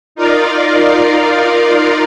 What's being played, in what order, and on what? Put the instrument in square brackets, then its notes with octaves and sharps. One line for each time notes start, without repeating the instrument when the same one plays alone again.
[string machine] D#4 F4 A#4 D5 F5